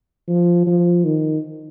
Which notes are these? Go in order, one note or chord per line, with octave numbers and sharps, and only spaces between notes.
F3
F3
D#3